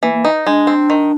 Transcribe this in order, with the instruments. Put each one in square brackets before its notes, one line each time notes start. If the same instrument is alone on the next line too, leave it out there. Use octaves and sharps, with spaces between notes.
[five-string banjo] E3 [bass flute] A#3
[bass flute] A#3
[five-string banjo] D#4
[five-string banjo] G#3 [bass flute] D4
[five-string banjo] C4
D#3